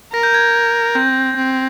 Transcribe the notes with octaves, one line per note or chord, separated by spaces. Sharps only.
A#4 A#6
G6
G#6
C4 G6
C4